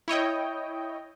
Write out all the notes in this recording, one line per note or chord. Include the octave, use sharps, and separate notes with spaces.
E4 C#5 D#5 G5